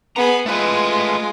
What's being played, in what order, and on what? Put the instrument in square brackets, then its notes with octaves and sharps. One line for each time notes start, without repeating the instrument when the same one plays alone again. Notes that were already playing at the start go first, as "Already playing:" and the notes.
[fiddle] B3 G#4 [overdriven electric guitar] A#5 B5
[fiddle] G#3 F4 [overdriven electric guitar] A3 B4